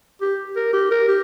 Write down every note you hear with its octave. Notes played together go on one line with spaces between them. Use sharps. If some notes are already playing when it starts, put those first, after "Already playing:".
G4
A#4
G4
A#4
G4